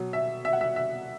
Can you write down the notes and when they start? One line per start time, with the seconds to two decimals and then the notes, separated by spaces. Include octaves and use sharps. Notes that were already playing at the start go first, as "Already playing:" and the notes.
Already playing: B2 F#3
0.13 E5
0.45 E5
0.53 F#5
0.61 E5
0.76 E5